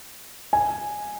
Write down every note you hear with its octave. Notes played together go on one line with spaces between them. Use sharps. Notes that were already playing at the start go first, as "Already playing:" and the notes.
G#5